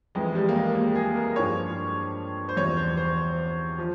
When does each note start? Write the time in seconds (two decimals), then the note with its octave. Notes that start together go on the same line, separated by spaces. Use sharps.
0.15 F2 E3 G#3
0.35 G3
0.49 A#3
0.55 G#3
0.76 A#3
0.95 G#4
1.16 A#4
1.36 G2 F3 C#5
2.49 C5
2.57 E2 C3 F3 C#5
2.77 C5
2.97 C5
3.78 F3